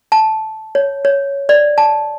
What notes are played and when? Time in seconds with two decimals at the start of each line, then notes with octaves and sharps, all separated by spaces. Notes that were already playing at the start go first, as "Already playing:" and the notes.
0.12 A5
0.75 C#5
1.05 C#5
1.49 D5
1.78 A5